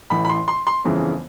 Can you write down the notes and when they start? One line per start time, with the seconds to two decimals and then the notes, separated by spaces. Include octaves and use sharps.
0.10 A1 A2 E3 B5
0.25 B5
0.29 C6
0.48 C6
0.67 C6
0.85 G1 F2 C#3 E3